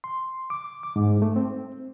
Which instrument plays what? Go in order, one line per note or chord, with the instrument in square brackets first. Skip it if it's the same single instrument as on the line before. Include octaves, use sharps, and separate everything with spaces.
[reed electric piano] C6
D6
D6
G#2
A3
C4